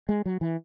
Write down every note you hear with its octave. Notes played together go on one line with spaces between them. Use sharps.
G#3
F#3
E3